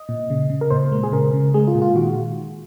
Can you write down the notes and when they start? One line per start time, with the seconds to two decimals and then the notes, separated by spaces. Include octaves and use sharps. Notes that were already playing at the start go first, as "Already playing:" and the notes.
Already playing: D#5
0.09 A#2
0.30 C#3
0.50 C#3
0.61 A#4
0.70 A#2 C5
0.92 G#3
1.04 G#4
1.12 C#3 A#4
1.33 C#3
1.54 G#3 G#4
1.68 F4
1.75 A#2
1.82 F4
1.95 D#3 F#4